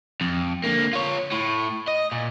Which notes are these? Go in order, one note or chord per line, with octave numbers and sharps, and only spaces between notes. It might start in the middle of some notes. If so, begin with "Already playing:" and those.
F2
D3 A#3
F4 C#5
A2
D#5
A#2